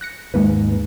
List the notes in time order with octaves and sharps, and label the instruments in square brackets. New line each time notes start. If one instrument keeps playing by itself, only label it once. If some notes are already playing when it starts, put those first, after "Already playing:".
[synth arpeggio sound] F#6 A#6 C#7
[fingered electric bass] D#2 G#2 [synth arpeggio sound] G#3 A#3 B4